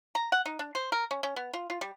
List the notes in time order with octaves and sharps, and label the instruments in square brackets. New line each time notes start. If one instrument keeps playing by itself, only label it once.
[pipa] A#5
F#5
D#4
D4
C5
A#4
C#4
C#4
B3
F4
F4
G3